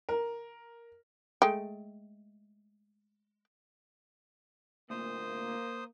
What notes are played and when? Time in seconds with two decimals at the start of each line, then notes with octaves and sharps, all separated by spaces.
0.09 A#4
1.42 G#3 A3 G5
4.90 D2 A#2 A#3 C5 D#6